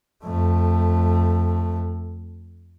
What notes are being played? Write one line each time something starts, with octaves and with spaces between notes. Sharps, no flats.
F2 A3